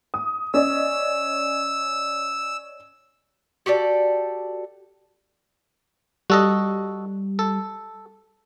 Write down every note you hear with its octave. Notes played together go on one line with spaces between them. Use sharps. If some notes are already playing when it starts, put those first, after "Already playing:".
D#6
C#4 D5 D#5 E6
F#4 G4 A4 D5
G3 F#4 A4 D#5
A4